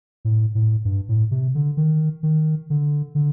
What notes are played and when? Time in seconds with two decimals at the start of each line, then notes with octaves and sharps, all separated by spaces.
0.25 A2
0.55 A2
0.85 G2
1.09 A2
1.31 C3
1.55 D3
1.77 D#3
2.23 D#3
2.70 D3
3.15 D3